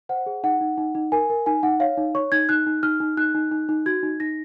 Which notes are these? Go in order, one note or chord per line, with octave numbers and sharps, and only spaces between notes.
C5 F#5
G#4
D#4 F#5
D#4
D#4
D#4
A#4 G#5
A#4
D#4 G#5
D#4 F#5
C#5 F5
D#4
C#5 C#6
D#4 G#6
D#4 F#6
D#4
D#4 F6
D#4
D#4 F#6
D#4
D#4
D#4
F#4 G#6
D#4
D#4 A#6